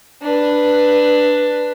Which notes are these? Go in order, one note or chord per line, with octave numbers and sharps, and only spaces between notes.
D4 B4